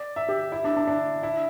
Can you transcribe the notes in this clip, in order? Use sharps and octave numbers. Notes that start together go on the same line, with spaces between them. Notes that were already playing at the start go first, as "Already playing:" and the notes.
Already playing: D5
E5
G4
E4
D4
D4
D4
E4